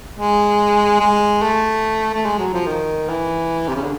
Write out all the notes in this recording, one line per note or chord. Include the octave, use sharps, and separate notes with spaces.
G#3
G#3
A3
A3
G#3
F#3
F3
D#3
E3
C3
C#3
D3